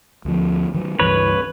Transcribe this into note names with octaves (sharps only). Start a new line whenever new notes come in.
D2 F3
D#3 F#3
C#2 G2 E3 B4 C#5